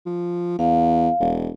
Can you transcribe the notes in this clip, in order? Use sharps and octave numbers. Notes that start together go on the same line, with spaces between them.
F3
E2 F5
E1